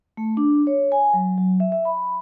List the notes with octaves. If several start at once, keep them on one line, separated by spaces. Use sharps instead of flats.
A3
D4
C#5
G#5
F#3
F#3
E5
E5
B5